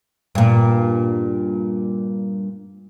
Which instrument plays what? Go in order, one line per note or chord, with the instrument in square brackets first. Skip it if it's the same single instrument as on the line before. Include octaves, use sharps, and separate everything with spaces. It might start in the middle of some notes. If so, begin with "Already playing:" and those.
[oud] G2 A#2